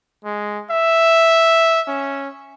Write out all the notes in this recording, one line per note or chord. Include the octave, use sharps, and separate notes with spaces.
G#3
E5
C#4